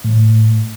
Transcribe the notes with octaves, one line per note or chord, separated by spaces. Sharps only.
A2